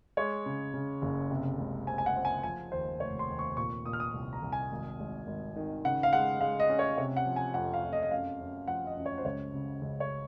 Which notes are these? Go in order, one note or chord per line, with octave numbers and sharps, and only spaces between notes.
G#3 C#5
C#3
C#3
F#1
C3
C#2
C4 G#5
G#5
F#5
C4
G#5
F3 G#5
D#2 C5
F1 C#5
C6
D#2
C#6
A#2 C#6
A#2 D#6
F6
D#6
C2
A#5
C2
G#5
G#1
G#1
G#1
D#3
C#3 F#5
F5
G#3 F#5
G#3 F5
D#5
C#4
C#5
C3 C#5
F#5
F3
G#5
F2 F#5
F5
F2
D#5
D#5
F#2 F5
F#2
F3 F#5
D#5
F#2
C#5
C5
C#2 C#5
C#3
C#2
C#5